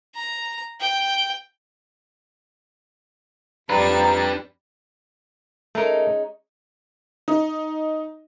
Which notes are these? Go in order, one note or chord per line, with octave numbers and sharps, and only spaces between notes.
A#5
G5
F2 G3 D4 B4 A#5 A6
G#3 A3 C#4 D#4 A#4
D#4